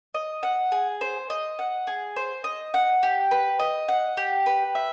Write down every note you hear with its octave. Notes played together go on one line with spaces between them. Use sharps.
D#5
F#5
G#4
C5
D#5
F#5
G#4
C5
D#5
F#5
G4
B4
D#5
F#5
G4
B4
E5